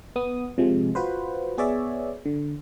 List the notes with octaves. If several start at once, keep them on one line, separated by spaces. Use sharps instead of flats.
B3 D#6
C3 F3 G#3
F4 F#4 B4 C5
B3 G#4 C#5 D5 E5
D3